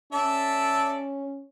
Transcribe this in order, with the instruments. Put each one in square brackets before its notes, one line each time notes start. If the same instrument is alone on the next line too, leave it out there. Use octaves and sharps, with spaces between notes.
[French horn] C#4 [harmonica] A4 D5 E5